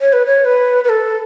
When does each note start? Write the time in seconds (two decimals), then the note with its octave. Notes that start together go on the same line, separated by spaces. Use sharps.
0.01 C#5
0.13 B4
0.26 C#5
0.45 B4
0.84 B4
0.89 A4